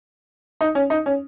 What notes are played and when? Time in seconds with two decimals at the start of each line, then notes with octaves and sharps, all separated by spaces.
0.61 D#4
0.75 C#4
0.90 D#4
1.06 C#4